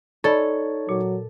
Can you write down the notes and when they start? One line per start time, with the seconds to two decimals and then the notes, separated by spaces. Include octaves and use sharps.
0.24 D#4 A4 C#5 D5 B5
0.89 A#2 F#3